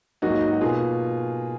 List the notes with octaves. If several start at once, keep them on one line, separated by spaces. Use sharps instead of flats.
G#2 F#3 A#3 D#4 F#4
F#4
B2 A#3 F4 G#4